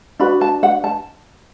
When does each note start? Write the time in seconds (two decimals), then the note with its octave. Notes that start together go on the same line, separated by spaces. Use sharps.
0.19 D4 F#4 B4 B5
0.41 A5
0.63 F#5
0.84 A5